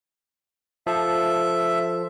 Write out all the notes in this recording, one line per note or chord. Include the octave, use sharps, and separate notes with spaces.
F3 A4 E5